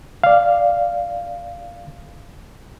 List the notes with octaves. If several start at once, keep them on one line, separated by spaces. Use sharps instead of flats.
D5 F5